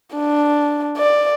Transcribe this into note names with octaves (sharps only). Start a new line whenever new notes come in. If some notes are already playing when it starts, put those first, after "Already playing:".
D4
D5